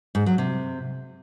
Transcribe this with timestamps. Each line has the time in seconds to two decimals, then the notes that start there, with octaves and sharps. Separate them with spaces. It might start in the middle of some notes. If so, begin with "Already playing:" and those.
0.15 G#2
0.26 F#3
0.38 C3